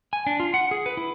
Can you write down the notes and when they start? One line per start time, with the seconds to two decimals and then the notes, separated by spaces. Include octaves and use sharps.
0.13 G#5
0.27 D4
0.40 F4
0.54 F#5
0.71 G#4
0.86 B4
0.97 E4